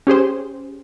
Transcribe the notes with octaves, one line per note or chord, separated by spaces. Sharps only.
C#4 G4 G#4 C5